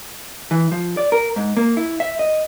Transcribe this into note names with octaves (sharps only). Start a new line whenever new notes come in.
E3
F3
D5
A#4
G#2
A#3
E4
E5
D#5